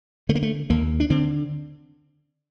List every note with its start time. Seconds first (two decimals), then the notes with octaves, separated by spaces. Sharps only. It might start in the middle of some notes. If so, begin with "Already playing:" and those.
0.29 D3 A3
0.35 A#3
0.43 A3
0.70 D#2 A#3
1.00 D4
1.10 D3 C4